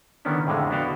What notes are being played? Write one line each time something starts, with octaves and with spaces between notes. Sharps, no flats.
D3 D#3 B3 C#4 D4 E4
F2 A2 D3 G#3 A3
B3 D4 E4 F#4 F5 G5